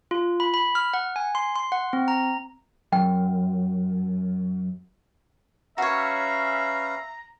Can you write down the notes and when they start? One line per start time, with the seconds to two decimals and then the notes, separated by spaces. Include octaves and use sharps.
0.11 F4
0.40 B5
0.54 B5
0.75 F6
0.94 F#5
1.16 G#5
1.35 C6
1.56 C6
1.72 F#5
1.93 C4
2.08 A#5
2.93 F#2 G5
5.78 C#4 F#4 B4 C#5 E5 F5 A#5